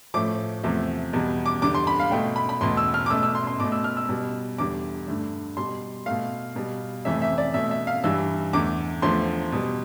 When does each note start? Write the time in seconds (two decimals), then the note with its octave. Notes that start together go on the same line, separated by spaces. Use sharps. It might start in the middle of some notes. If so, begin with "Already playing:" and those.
0.14 A2 F3 A3 D6
0.63 E2 C3 F3 A3
1.13 E2 B2 G3
1.46 D6
1.62 E2 D3 G3 D6
1.74 C6
1.87 B5
2.00 F5
2.11 B2 A3 G5
2.36 B5
2.49 B5
2.61 E2 B2 A3 C6
2.77 E6
2.94 F6
3.06 D6
3.10 B2 A3 E6
3.23 E6
3.35 C6
3.47 C6
3.60 B2 A3 D6
3.72 E6
3.84 F6
3.97 E6
4.09 B2 G3
4.58 E2 D3 G3 D6
5.08 G2 D3 A3
5.57 B2 G3 C6
6.06 B2 A3 F5
6.55 B2 G3
7.05 F2 C3 E3 A3 E5
7.22 E5
7.38 D5
7.54 B2 A3 E5
7.71 E5
7.87 F5
8.04 G2 E3 G3 E6
8.53 E2 D3 A3 D6
9.02 E2 D3 F3 A3 C6
9.52 B2 G3